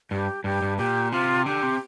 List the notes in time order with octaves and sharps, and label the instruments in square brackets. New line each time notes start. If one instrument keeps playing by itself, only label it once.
[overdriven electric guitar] G2 [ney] G4
[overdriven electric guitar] G2 [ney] G4
[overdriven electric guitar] G2
[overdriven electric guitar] A#2 [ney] G4
[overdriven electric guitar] C3 [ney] F4
[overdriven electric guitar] D3 [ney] G4
[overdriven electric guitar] C3